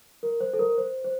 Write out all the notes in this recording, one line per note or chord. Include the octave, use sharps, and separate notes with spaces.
A#4
C5
A4
A#4
C5
C5